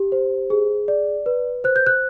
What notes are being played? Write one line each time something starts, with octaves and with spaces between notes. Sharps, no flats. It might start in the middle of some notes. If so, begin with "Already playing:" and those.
Already playing: G4
C5
G#4
D5
B4
C5 F#6
G6
F#6